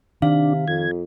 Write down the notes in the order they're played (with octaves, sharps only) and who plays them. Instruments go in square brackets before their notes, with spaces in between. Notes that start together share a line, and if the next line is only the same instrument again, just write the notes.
[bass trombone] C3 [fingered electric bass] D#3 [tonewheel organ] D4 [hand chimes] F5
[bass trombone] F2 [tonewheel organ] G#6